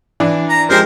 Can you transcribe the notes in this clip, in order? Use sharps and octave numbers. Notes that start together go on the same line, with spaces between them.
E3 D4
A#5
F3 G#3 G4 A#4 C5